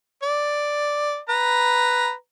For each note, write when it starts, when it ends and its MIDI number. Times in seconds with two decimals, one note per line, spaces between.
0.23 1.18 74
1.29 2.13 71
1.29 2.13 82